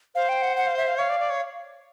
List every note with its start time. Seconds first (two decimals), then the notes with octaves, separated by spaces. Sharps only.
0.15 C5 F5
0.29 G5
0.42 F#5
0.57 F#5
0.67 F5
0.77 E5
0.88 F5
0.98 C#5 F5
1.09 D5
1.20 D5
1.30 C#5